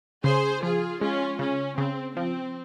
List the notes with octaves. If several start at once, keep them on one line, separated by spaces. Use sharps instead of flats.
C#3 G#4 C5
F3 F4 G#4
G#3 C#4 F4
C#3 C#4
C#3 C4
F3 C4